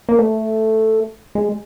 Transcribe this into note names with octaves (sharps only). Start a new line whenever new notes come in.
A#3
A3
G#3